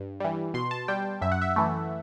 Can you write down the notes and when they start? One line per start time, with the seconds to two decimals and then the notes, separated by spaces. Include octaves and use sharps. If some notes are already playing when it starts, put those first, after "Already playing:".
Already playing: G2
0.20 E3 G3
0.54 B2 C6
0.71 A5
0.88 G3 G5
1.21 F#2 E5
1.32 F#5
1.42 E5
1.56 E3 A3